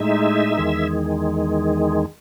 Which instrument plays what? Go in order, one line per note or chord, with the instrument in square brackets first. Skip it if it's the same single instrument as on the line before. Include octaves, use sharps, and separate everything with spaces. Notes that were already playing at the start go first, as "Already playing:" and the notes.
Already playing: [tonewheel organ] A2 G#3 D#4 E5
E2 D#3 G#3